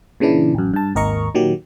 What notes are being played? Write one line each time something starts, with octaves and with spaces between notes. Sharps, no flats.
A#2 C#3 E3 D4 E4
A1 F#2
G2 A5
G#1 D#2 A#4 D#5 A#5 C#6
A#2 D#3 F#3 G4